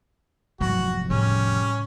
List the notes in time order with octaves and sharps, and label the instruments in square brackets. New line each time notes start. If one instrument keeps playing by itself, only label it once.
[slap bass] F1 E2 [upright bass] G#2 F#3 [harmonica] F#4
[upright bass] A2 C#3 [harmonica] G3 C#4